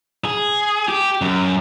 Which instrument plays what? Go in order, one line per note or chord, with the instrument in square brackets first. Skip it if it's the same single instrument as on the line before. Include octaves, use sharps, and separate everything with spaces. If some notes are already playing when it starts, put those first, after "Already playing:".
[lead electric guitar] G#4
G4
F#2